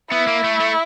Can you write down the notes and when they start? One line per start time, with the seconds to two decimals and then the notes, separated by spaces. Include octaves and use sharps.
0.11 B3 E4
0.27 A#3
0.44 A3
0.60 A3